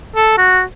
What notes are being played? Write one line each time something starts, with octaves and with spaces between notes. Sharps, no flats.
A4
F#4